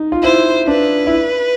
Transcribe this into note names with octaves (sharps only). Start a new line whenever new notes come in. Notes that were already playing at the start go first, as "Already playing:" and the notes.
Already playing: D#4
F4
E4 C5
D4 B4
E4